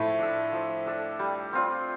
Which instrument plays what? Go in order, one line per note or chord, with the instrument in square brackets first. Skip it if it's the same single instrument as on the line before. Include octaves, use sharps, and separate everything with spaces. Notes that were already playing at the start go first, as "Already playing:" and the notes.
Already playing: [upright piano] A2 A3 [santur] F3
[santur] D4 A4
F3
D4 A4
G3
C4 F4 D5